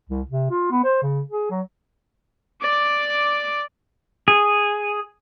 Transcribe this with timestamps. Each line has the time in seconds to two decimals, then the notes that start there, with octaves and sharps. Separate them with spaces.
0.09 C2
0.30 C3
0.50 F4
0.71 B3
0.84 C5
1.02 C#3
1.30 G#4
1.50 F#3
2.61 D5 D6
4.28 G#4